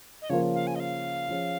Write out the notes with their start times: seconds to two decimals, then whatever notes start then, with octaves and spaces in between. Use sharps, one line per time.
0.22 D#5
0.29 C#3 F3 A#3 F4 A#4 C#5
0.55 F5
0.67 G#5
0.75 D#5
0.80 F5
1.28 F3 C#4 G#4